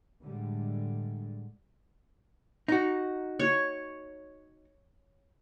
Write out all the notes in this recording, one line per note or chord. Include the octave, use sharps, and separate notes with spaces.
A2 D3 G3 G#3
D#4 F#4
C#5